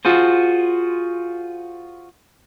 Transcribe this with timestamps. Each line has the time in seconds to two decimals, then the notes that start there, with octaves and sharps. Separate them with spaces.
0.05 F4 F#4 G#4 C5